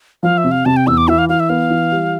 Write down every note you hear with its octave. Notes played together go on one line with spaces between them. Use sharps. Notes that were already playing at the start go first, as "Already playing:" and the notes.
F3 F5
E5
C3
F5
C3 A5
G5
E2 E6
D6
E3 E5
F5
E3 F5
E5
B3 F5
E3
G3